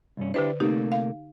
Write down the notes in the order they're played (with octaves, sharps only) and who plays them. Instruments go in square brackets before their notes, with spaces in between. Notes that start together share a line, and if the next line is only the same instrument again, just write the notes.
[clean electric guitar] C2 G2 C#4
[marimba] D3 B4 C5 [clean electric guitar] D4 E4 G4
[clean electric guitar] C3 A3 A#3 [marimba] D#4 G4
[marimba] F5